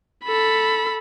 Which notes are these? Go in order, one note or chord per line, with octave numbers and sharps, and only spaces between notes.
A4 B5